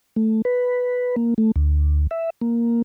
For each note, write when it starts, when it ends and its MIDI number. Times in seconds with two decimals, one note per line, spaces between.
0.16 0.42 57
0.45 1.16 71
1.16 1.34 58
1.38 1.51 57
1.56 2.07 38
2.11 2.30 76
2.41 2.82 58